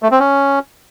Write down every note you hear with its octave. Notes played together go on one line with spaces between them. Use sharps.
A3
C4
C#4